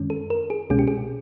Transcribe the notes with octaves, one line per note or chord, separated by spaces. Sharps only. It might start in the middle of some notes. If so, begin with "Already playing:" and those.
Already playing: F#2 D#3 G#3 C#4
A4
A#4
G#4
C2 B2 G#3 C#4 G#4
G4
G#4